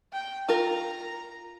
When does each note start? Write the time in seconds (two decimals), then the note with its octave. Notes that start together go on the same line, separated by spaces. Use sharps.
0.12 G5
0.49 F4 A#4 A#5